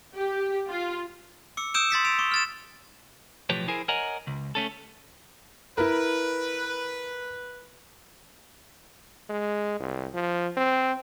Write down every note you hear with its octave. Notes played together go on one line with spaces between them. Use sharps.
G4
F4
D6 E6 C#7
D#6 E6 G6 D7 E7
C6 A6 B6 C#7
C6 E6 D7 F7
C#6 D#6
F6 A6 E7
B1 A2 F3 G4 B4 C#5
E4 G#4 A#4 C5 G#5
A#4 C#5 D#5 F#5 G#5 A#5
C#2
A3 C#4 A4
E4 A#4 B4
G#3
C2
F3
C4